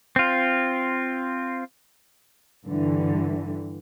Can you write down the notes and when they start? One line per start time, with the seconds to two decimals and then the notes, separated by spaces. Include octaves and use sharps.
0.16 C4 F4
2.66 G2 D3 E3 G3